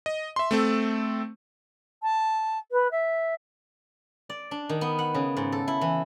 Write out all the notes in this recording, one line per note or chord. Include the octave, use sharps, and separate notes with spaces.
D#5
E5 C6
A3 C4 A4
A5
B4
E5
D5
D4
D#3
B3
F#5
C#3
G#2
A4
E4
E3